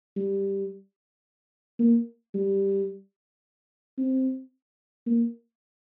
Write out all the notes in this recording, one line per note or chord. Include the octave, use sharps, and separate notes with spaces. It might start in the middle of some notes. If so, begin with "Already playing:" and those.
G3
A#3
G3
C4
A#3